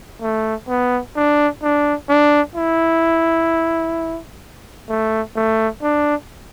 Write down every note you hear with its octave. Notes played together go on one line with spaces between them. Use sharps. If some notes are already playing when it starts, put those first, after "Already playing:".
A3
B3
D4
D4
D4
E4
A3
A3
D4